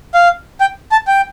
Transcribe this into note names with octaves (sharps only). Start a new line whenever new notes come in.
F5
G5
A5
G5